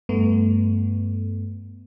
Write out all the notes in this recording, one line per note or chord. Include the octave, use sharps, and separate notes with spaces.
G2 A3 B3